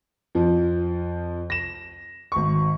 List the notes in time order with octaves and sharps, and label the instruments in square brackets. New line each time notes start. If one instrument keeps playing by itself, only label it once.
[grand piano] F2 F3
A#6 E7
G#1 C#6